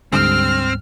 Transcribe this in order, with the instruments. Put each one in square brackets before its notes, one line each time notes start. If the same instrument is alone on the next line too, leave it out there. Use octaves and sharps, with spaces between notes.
[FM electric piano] D2 G#2 G3 [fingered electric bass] D3 [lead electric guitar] C4 [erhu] F6